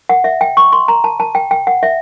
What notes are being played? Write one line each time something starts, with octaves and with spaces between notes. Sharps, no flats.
F#5
E5
G5
C#6
C6
A#5
A5
A5
G5
G5
F#5
E5